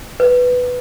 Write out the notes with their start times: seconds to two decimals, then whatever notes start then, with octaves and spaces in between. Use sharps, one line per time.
0.20 B4